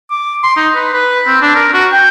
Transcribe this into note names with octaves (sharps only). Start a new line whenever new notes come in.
D6
C6
D#4
B4
B4
C4
D4
A#4
F#4
G5